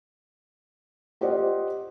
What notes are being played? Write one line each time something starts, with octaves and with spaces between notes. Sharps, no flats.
F4 G4 C5 D5 D#5 F#5